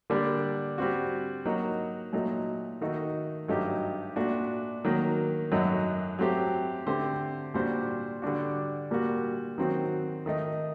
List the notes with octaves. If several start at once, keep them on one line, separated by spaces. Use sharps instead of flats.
D3 G3 A#3 D4
G3 C4 F#4
F#3 A#3 D#4 F#4
A#2 F#3 A3 D#4
D#3 A3 D#4 F#4 A4
G2 F#3 A3 D#4 G4
A#2 A3 D4 F#4
D#3 F#3 A#3
F#2 F#3 A3 D#4 A4
F#3 A3 C4 G4
D3 A3 C4 G4 C5
A#2 G3 D4 F#4 C5
D3 G3 D4 F#4
A#2 G3 A#3 F#4
D#3 F#3 C4 F#4
D#3 A3 D#4